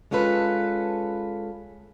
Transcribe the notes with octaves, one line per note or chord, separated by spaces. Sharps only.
G#3 C#4 F4 A4 B4